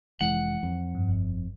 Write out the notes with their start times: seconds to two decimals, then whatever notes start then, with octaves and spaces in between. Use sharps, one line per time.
0.21 F1 E3 G#3 F#5
0.63 F2
0.95 G2
1.09 G1